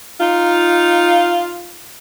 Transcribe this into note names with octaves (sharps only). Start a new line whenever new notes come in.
D#4 F4